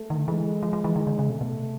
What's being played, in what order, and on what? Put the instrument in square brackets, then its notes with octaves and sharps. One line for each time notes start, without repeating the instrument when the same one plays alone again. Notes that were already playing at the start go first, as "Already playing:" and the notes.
Already playing: [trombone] A3
[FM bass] D#3
D3
[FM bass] E3 [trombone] G#3
[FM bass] F3
F3
E3
D#3
D3
C#3
[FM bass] B2 [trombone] A3
[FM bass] B2
C3